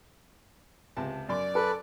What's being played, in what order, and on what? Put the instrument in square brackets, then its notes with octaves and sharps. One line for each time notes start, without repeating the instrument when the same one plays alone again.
[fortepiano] C#2 C3 A5
[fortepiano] F#2 C6 [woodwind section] D5
[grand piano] A4 [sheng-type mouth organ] B4